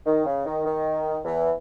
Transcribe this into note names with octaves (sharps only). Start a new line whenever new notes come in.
D#3
C#3
D#3
D#3
E2 E3